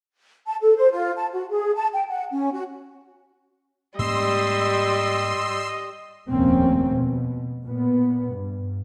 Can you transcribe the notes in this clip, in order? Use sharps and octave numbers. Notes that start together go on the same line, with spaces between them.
A5
A4
C5
F4
A5
F#4
G#4
A5
G5
F#5
C#4
F#4
G#2 G3 A#3 C#4 D#5 C6 E6
F1 D#2 A#2 A#3 C4 C#4
B2
A#2 B3
G2